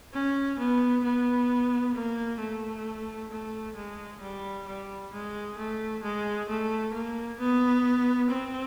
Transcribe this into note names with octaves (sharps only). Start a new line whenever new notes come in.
C#4
B3
B3
A#3
A3
A3
G#3
G3
G3
G#3
A3
G#3
A3
A#3
B3
C4